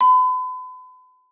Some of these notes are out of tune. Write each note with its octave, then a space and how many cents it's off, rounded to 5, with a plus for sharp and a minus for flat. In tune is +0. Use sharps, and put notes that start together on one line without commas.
B5 +40